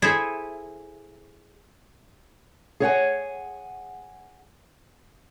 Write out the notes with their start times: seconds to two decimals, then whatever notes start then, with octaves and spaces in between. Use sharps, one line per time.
0.02 E4 G#4 A4 C5 E5
2.80 G#4 C#5 F#5 G#5